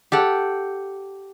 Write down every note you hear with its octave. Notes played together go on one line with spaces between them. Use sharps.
G4 A4 F#5